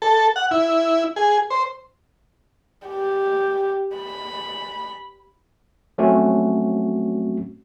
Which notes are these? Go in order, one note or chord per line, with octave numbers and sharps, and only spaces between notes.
A4
F#5
E4
G#4
C5
G4
B5
F#3 A3 C4 C#4 F#4